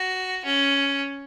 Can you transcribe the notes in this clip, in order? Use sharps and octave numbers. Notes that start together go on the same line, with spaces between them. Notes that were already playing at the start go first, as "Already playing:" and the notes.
Already playing: F#4
C#4